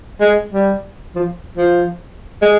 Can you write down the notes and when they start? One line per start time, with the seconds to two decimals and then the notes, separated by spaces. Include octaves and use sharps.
0.21 G#3
0.53 G3
1.15 F3
1.57 F3
2.42 G#3